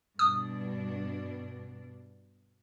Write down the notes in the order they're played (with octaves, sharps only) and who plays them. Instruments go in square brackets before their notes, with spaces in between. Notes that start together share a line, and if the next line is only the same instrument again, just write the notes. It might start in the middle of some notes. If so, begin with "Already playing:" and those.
[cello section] G2 B2 D4 [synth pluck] D#6